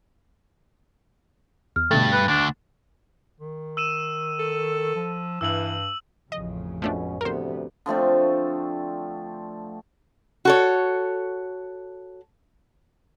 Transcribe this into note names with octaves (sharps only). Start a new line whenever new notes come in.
E2 F6
G2 B2 D3 A3 A6
B4
D2 D4
D#3
E6 D#7 E7
A4
F3
G2 E3 E6 F#7
A1 F2 C#3 D#5
C#2 B2 F3 A3 C#4 D4
D2 C3 F3 B3 A#4 C5
D3 F3 A3 C4
F#4 A4 C#5